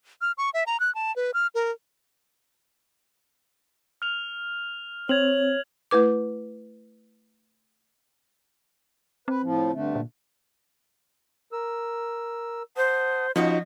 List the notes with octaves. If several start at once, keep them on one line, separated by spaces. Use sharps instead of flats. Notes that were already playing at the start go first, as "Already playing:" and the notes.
F6
C#6
E5
A#5
F#6
A5
B4
F6
A#4
F6 F7
C4 C#5 G#6 F7 F#7
A3 E4 B4 D6
C4 B4
A2 F3
G2 D3 A3
A#2
A#4 E6
C5 F#5 A5 D#6
F3 C#4 D#4 F#4 D#5 B5